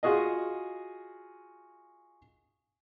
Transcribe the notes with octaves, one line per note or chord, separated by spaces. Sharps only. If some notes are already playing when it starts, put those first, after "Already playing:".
F4 F#4 G#4 D#5